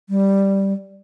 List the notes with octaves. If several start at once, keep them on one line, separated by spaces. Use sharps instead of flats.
G3